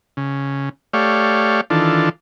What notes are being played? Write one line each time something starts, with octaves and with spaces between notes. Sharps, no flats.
C#3
A3 G4 C#5 D5 F5
D#3 E3 D4 F4 A4